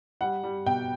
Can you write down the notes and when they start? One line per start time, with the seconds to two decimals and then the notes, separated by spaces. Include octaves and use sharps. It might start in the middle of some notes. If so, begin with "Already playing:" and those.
0.21 G3 F#5
0.43 G3
0.66 B2 G5